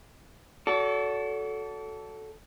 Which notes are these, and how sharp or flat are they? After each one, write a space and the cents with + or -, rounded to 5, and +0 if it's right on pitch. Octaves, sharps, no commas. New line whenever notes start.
F#4 +0 A4 -5 D5 -45